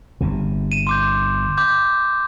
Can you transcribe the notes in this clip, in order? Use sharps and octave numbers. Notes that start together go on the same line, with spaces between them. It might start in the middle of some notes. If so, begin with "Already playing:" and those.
G1 E2 C3
D#7 E7
C6 D6 G6
D6 G6